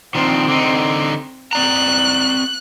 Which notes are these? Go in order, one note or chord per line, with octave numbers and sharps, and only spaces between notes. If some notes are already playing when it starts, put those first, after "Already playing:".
D#3 F3 C4 D4
D3 D#4
C4 D5 A#5 F#6